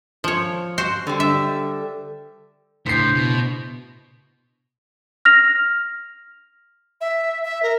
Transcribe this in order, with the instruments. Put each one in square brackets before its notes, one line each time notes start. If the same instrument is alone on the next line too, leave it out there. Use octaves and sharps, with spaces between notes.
[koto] F3 C#5
F#4 C5
[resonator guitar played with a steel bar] D3 G3
[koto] E5
[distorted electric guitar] A2 [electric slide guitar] C#3 D4 E4 [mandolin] C5 G6 [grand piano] B6 C7
[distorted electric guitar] B2
[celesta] F6 A#6 F7
[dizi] E5
E5
A#4